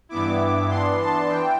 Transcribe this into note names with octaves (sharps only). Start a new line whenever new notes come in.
G2 E3 B3 E4 D6
E3 B3 D4 C6
A5
E3 G5